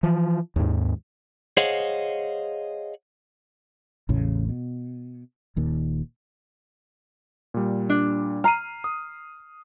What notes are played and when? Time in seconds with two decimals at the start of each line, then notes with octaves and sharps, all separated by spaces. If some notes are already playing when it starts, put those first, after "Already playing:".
0.03 E3 F3
0.56 D#2 G#2
1.57 G#4 C5 C#5 D#5 F5 F#5
4.09 A1 E2 A2 C#3
4.49 B2
5.56 D#1 D#2 A#2
7.54 A#2 G3
7.90 D4
8.44 A#5 F6 C7 D#7
8.84 D#6